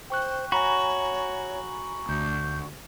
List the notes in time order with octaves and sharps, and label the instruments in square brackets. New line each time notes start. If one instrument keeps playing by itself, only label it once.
[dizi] C5 [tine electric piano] G5 C#6 F#6
[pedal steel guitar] F#4 [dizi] C#5 [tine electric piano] G#5 A#5 B5
[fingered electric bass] D2 [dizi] G6